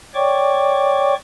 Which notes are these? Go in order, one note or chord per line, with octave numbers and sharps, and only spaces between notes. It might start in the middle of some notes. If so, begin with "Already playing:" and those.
C#5 D5 G5 C#6 D6